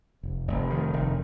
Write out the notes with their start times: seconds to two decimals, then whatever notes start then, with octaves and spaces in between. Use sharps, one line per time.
0.23 F1
0.48 F1
0.70 D#3
0.93 F1